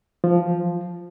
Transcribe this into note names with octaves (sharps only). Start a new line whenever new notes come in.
F3